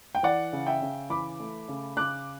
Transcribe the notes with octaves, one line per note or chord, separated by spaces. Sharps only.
G5
E3 D5 F#5
C#3
E5 G5
C#3
E3 B5 D6
A3
C#3
C#3 D6 F#6